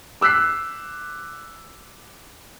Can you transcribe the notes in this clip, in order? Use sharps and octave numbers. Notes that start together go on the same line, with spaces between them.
D6 E6 F#6 B6 C7